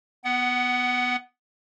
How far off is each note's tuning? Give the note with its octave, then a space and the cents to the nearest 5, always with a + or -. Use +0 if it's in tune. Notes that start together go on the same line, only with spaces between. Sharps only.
B3 +0 F#5 +20